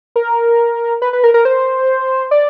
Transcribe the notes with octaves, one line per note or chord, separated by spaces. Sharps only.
A#4
B4
B4
A#4
A#4
C5
D5